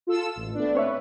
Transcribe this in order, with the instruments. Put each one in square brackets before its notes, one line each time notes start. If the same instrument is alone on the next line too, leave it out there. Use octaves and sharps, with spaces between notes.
[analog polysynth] F4 A4 E6
A1
A3 B3 D4
[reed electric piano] C4 C#5 E5 [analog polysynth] B4